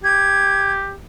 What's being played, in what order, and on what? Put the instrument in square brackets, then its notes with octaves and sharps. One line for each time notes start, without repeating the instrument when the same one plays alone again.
[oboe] G4 [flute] G#6